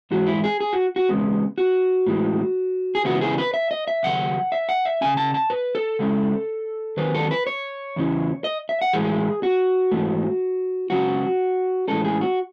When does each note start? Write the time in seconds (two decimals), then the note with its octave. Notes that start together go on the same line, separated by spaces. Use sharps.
0.11 G#2 E3 G#3 F#4
0.27 E4
0.44 G#4
0.60 G#4
0.73 F#4
0.96 F#4
1.09 E2 C#3 G#3 B3
1.58 F#4
2.06 A2 E3 G#3
2.95 G#4
3.05 C#2 C#3 E3 B3 E4 F#4
3.21 G#4
3.38 B4
3.54 E5
3.71 D#5
3.88 E5
4.03 D#2 C#3 F#3 F#5
4.52 E5
4.69 F#5
4.85 E5
5.01 C#3 F#3 C#4 G#5
5.17 A5
5.34 A5
5.50 B4
5.75 A4
5.99 C#3 G#3 C#4 E4
6.97 D#2 D#3 F#3 B4
7.15 A4
7.31 B4
7.47 C#5
7.96 E2 C#3 E3
8.44 D#5
8.69 E5
8.82 F#5
8.93 A2 E3 G#3 G#4
9.43 F#4
9.92 G#2 E3 A3
10.90 C#2 C#3 F#3 B3 F#4
11.88 A2 E3 G#3 C#4 A4
12.05 G#4
12.21 F#4